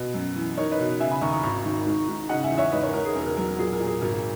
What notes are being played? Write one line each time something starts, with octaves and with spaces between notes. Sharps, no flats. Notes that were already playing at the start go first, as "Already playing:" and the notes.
Already playing: B2
F#2
E3
D#4 A#4 C#5
B4 D#5
B2
C#3 E5 G#5
G#5 B5
D#2 A#5 C#6
A#5 C#6
G#1 A#5 C#6
D#3
G#2
G#2
C#3 D#5 F#5
E5 G#5
E2
C#5 E5
G#2 B4 D#5
A#4 C#5
G#2 A#4
G#4
E1 A#4
A#4
F#3 A#4
A#4
A#2 G#4
A#4
A#2
G#4
G#1 A#4